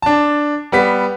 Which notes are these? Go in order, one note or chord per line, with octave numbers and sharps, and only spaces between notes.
D4 A5
G3 B3 B6